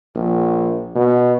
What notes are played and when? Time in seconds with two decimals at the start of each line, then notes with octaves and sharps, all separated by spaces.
0.16 A#1
0.96 B2